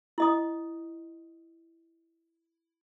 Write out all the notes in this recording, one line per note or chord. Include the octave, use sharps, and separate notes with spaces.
E4 D#5 D#6